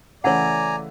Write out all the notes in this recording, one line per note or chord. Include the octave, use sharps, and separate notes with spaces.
C#3 E3 A3 C#5 D5 F#5 G#5 A#5